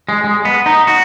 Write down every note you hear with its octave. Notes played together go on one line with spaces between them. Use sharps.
G#3
G#3
B3
D#4
F#4